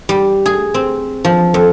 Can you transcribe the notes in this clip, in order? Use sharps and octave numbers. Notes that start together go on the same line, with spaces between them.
G3
G#4
C4
F3
F2